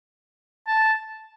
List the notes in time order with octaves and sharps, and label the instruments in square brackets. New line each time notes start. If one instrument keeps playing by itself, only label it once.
[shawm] A5